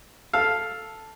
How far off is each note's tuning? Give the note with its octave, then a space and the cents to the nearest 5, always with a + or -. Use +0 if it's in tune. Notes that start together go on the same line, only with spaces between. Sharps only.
A4 +0 F5 +0